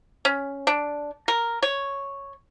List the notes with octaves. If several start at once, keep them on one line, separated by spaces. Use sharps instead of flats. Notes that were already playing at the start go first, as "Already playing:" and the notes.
C#4
D4
A#4
C#5